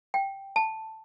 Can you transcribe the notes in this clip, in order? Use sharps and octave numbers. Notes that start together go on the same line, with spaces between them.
G5
A5